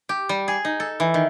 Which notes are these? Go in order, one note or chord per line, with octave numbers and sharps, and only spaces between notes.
G4
G3
G#4
D#4
A4
E3
D#3